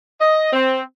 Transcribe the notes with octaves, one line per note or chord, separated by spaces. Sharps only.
D#5
C4